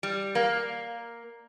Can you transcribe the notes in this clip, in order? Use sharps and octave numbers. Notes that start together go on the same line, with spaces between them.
G3
A#3